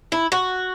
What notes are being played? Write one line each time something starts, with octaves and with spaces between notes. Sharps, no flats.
E4
F#4